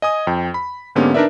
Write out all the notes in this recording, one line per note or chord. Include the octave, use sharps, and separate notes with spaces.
D#5 G#5 D#6
F2 G5
B5
G#2 D3 A#3 B3 C#4 G4
D4 D#4 A#4 B4 D5 E5